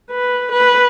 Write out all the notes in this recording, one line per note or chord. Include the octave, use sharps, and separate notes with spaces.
B4
B4